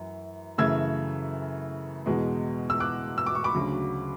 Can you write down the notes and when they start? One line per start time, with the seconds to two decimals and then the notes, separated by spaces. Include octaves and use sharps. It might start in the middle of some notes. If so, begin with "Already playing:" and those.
Already playing: F#2 E3
0.58 F#2 C#3 E3 A3 E6 G#6
2.06 E2 B2 G#3
2.70 E6
2.80 D6 F#6
3.18 E6
3.26 D6
3.35 C#6
3.44 B5 D6
3.54 D2 C#3 F#3